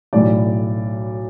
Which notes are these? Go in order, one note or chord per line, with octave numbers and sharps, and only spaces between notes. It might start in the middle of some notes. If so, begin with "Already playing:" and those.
B1 A2 E3 D5